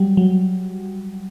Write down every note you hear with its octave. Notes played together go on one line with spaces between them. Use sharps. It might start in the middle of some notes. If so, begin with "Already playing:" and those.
Already playing: F#3 G3
F#3